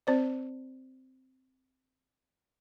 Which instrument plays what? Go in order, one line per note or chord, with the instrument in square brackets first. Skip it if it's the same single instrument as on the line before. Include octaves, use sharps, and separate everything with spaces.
[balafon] C4 C5 D5